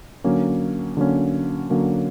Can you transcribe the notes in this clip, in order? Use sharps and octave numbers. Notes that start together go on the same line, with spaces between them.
D3 F#3 A#3 C#4
D3 F#3 A#3 C#4
D3 F#3 A#3 C#4